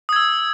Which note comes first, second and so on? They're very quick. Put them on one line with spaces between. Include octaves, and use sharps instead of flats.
D#6 G#6 E6